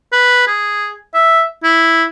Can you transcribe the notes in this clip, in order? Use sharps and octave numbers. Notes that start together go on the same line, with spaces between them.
B4
G#4
E5
E4